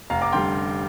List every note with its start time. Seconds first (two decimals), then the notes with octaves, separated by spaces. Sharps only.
0.10 F1 F5 A#5
0.22 A#5 D6
0.32 D3 G3 G5 C6